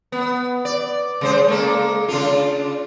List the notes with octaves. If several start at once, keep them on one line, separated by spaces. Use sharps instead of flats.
B3
D5
C#3 G#3 C5
G#3 A#3 A4
C#3 D4 F4